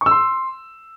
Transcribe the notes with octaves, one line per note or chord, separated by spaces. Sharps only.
C#6
E6
C6